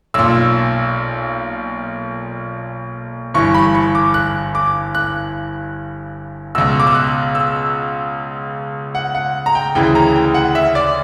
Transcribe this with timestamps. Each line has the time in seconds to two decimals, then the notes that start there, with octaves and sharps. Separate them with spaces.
0.14 B1 A#2 E6
3.34 G1 G2 E3 C#6
3.54 B5
3.75 C#6
3.95 D6
4.14 F#6
4.55 D6
4.95 F#6
6.55 C#2 B2 E6
6.80 D6
6.87 E6
6.95 F#6
7.35 E6
8.95 F#5
9.15 F#5
9.46 A#5
9.55 G5
9.75 D2 C#3 E3 G5
9.95 A#5
10.15 G5
10.34 F#5
10.55 E5
10.75 D5